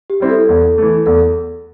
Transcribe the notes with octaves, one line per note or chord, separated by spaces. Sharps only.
G4
G3 C4 E4
A4
E2
E3 A3
E2 A4